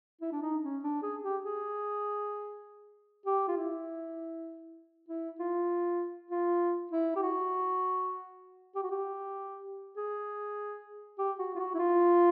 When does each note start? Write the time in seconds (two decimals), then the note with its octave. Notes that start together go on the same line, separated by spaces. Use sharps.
0.21 E4
0.32 D4
0.42 D#4
0.63 C#4
0.83 D4
1.03 G#4
1.24 G4
1.43 G#4
3.26 G4
3.48 F4
3.57 E4
5.08 E4
5.40 F4
6.31 F4
6.92 E4
7.16 G4
7.22 F#4
8.75 G4
8.83 F#4
8.91 G4
9.96 G#4
11.18 G4
11.39 F#4
11.55 F4
11.59 F#4
11.75 E4
11.79 F4